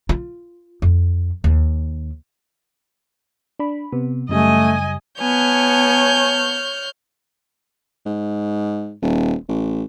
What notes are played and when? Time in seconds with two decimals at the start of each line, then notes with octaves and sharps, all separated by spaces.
0.09 F4
0.82 F2
1.44 D#2
3.59 D4 B5
3.92 C3 B3
4.29 F#2 C#3 G3 A3 D#5 G#5
5.20 B3 C#5 G#5 A5 F6 G6
8.06 G#2
9.02 D#1
9.48 A1